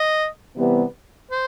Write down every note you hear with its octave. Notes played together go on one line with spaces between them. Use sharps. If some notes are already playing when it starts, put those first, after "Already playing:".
Already playing: D#5
C3 E3 G3 B3
C5